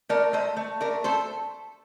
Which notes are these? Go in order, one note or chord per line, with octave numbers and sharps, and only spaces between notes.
A3 A#4 D5
A3 C5 D#5
A3
A3 A#4 D5
A3 A4 C5